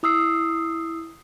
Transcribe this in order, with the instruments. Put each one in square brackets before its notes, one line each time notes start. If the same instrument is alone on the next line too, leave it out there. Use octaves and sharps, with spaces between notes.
[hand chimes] E4 D#6 E6 C7